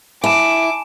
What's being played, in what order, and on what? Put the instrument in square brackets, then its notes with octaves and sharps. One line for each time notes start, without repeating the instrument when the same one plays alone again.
[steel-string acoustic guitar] E4 [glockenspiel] G#5 A5 E7 [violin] D6